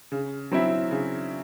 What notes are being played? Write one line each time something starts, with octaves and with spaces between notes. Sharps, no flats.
C#3
F#3 C4 E4
C#3